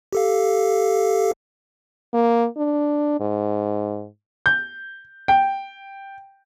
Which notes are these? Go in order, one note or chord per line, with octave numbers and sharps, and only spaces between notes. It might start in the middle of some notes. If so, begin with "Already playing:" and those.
G4 A4 F5
A#3
D4
G#2
G6
G5